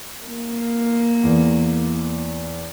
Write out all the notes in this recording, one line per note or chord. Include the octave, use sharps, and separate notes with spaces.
A#3
E2